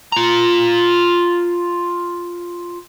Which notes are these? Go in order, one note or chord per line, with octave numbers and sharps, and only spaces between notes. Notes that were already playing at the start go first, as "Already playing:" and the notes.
F4 A#5